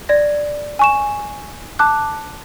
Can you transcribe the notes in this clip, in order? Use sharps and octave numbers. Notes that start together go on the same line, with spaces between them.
D5 G#6 A#6
G#5 C#6 E7
A5 D6 F#6